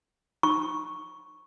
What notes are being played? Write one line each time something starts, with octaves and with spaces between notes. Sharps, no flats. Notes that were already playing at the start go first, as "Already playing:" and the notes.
C#6